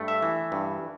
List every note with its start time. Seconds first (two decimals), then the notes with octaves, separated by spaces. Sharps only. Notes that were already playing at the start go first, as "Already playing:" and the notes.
Already playing: G2 A3
0.08 E5
0.22 E3
0.52 G2